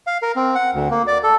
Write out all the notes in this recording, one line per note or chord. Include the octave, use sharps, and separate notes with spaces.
F5
A#4
C4
F#5
D2
A#3
D5
A4